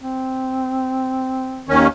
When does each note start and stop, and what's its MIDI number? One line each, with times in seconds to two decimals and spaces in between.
0.02 1.73 60
1.69 1.87 39
1.69 1.87 51
1.69 1.87 61